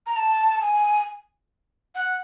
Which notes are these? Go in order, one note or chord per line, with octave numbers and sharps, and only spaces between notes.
A#5
A5
G#5
F#5